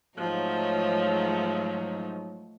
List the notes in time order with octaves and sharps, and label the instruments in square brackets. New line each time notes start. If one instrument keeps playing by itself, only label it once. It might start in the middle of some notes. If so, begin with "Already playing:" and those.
[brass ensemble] G#2 F#3 [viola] F3 [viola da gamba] A3 D#4